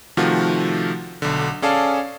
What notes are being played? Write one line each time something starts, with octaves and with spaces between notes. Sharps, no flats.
C3 D#3 F3 A3 F4 F#4
B1 D3
C#4 G#4 A4 D5 F5 A5